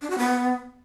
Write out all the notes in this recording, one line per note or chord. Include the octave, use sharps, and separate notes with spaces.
D4
F#4
B3